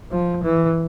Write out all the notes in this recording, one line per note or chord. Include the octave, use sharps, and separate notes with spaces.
F3
E3